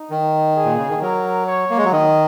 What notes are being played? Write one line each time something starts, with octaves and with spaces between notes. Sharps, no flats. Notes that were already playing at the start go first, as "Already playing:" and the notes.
Already playing: D#4
D#3
G#4
A#2
C#3
D#3
F#3 A#4
C#5
A#3
G#3
F#3
D#3 D#5